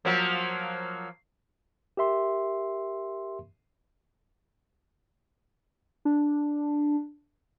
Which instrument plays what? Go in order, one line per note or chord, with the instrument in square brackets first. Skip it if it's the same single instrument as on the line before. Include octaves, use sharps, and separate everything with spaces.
[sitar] F3 F#3 A#3
[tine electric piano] G4 A#4 E5 C6
[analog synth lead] D4